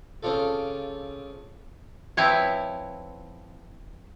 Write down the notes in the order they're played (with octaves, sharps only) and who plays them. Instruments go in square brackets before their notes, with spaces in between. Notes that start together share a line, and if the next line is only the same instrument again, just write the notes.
[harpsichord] C#3 C4 D4 F4 A4
[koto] F3 C4 E4 B4 C#5